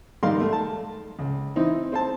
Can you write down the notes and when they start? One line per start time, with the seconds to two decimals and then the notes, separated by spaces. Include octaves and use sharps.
0.23 G#2 D#3 G3 A#4 F5 C6
0.40 A3
0.53 A5
1.19 C#2
1.56 E3 C4 D#4 E4
1.92 C4 C5 A5